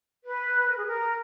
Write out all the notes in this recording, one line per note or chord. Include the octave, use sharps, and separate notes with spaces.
B4
A#4
G#4
A#4